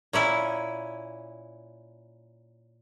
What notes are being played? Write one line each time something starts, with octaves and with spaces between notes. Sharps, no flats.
A#2 C#4 E4